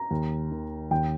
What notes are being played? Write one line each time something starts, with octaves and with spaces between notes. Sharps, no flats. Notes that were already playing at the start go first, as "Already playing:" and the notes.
Already playing: A#5
D#2
D#3
D#2 G5